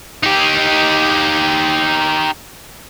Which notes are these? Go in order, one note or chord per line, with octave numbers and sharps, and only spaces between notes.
D#4 G4